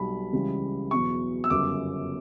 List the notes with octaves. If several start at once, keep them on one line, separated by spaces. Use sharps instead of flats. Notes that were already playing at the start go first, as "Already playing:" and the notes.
Already playing: B1 B2 G3 B5
C#2 C#3 E3 G3
E2 B2 F#3 C#6
E6
G1 F#2 C#3 G3 D6